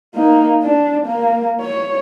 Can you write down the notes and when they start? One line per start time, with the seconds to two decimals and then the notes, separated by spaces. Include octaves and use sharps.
0.15 A#3 D#4
0.63 D4
1.05 A#3
1.61 C#5